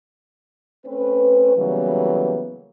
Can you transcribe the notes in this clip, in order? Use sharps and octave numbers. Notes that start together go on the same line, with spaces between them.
A3 C4 C#4 B4
C#3 E3 F#3 G3 A#3 B3